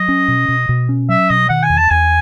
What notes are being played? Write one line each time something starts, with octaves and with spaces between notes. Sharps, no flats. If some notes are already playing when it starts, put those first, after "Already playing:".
Already playing: F#3 D#5
C#4
B2
B2
B2
C#4
F#3 E5
B2 D#5
D#3 F#5
G#5
E2
A5
E2 G#5